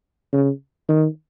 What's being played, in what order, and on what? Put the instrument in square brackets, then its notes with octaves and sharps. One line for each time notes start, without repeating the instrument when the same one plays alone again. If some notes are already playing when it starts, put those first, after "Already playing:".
[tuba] C#3
D#3